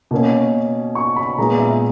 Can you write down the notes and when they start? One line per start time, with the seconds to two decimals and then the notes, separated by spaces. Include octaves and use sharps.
0.11 B2 A#3 C#4
0.95 C#6
1.16 B5
1.38 A#2 G#3 B3 A#5
1.58 E5